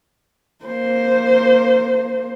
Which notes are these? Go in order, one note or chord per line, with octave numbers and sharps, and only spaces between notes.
A#3 C5